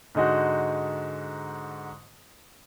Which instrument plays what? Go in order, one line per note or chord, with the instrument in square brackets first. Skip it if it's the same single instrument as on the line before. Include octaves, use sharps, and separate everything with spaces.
[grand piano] G#2 D3 G#3 D#4 F#4